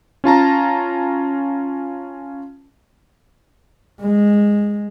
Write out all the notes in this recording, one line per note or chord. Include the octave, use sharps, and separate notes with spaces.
C#4 F4 A5 A#5
G#3